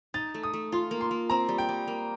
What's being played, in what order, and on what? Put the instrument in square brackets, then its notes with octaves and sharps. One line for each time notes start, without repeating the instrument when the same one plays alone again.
[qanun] D#4 [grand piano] A6
[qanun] A3
[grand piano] D#6
[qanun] A3
[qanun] F4 [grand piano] C6
[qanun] A#3
[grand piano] C6
[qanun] A#3
[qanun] C4 [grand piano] A#5
[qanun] G3
[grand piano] G5
[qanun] G3
A#3